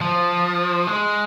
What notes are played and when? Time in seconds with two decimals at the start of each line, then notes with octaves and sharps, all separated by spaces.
0.01 F3
0.87 G#3